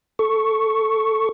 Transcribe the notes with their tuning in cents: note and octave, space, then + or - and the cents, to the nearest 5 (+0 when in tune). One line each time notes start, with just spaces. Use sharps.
A4 +0 C#6 +0